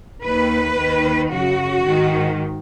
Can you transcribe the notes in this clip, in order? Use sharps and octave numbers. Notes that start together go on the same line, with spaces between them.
D#2 D#3 B4
D#2 D#3
F#2 C#3 F#4
G#2 D#3